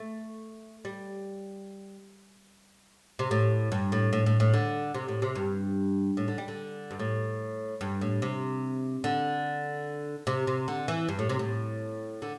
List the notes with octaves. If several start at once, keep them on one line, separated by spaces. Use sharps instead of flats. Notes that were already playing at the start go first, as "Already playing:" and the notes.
Already playing: A3
G3
C3
A2
G2
A2
A2
A2
A2
D3
C3
A2
C3
G2
A2
D3
G3
D3
G2
A2
G2
A2
C3
D3
C3
C3
D3
E3
G2
A2
C3
A2
D3